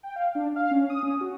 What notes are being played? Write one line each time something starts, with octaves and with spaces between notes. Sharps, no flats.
G5
F5
D4
F5
C#4
D#6
C#4
F#4